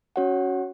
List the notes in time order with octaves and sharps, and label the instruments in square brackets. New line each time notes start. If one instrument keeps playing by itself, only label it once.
[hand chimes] C#4 F#4 C#5 F#5